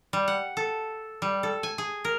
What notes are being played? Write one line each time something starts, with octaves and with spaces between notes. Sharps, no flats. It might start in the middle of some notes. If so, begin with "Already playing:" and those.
G3
F#5
A4
G3
A4
G#5
G#4
A#4